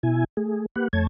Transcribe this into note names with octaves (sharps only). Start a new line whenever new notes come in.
B2 E4 G#5
A3 G#4
A#3 G4 B4 F#5
F2 A3 C#5 A5 G#6